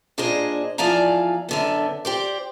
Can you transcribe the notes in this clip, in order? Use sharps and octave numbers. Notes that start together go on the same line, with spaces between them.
A#2 D4 G#4 C5 D#5
E2 F3 D5 F5 G#5 A#5
F#2 D3 B3
G4 C5 D5